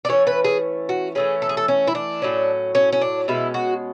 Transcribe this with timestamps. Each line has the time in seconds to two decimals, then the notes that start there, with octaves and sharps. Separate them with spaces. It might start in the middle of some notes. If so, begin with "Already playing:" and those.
0.05 D5
0.09 E3 A3 C#4 C#5
0.27 B4
0.44 G#4
0.89 F#4
1.15 E3 A3 C#4 G#4
1.42 A4
1.49 G#4
1.57 A4
1.68 C#4
1.87 E4
1.95 D4
2.22 A2 F#3 C#4
2.75 C#4
2.93 C#4
3.01 D4
3.28 B2 G#3 C#4 E4
3.54 F#4